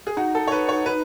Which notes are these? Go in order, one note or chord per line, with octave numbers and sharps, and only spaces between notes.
G#4
D#4 F#4
A4
C#5
B4
C#5
B4